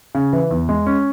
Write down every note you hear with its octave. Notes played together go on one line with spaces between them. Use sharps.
C#3
E3
E2
G#3
C#4